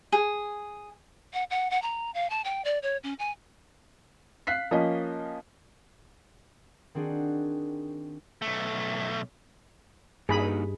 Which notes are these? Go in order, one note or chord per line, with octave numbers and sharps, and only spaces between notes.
G#4
F#5
F#5
F#5
A#5
F5
A5
G5
D5
C#5
C#4
G#5
F5 F#6 B6 C7
F3 A#3 C#4 D#5
D#3 C4 D4 F#4 G#4
B1 A3
G2 A#3 D#4 F#4 G#4 B5